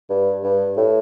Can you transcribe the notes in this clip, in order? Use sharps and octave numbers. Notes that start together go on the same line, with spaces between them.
G2
G2
A2